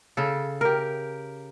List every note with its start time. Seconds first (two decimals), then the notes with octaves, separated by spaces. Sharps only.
0.17 C#3 A4
0.61 G4 A#4